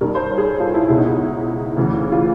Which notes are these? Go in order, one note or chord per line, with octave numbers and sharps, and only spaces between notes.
G2 D#3 A#4
C5
C#5
G#4
A4
F4
E4
C#2 B2 E4
D#4
E4
D2 C#3 E3
F4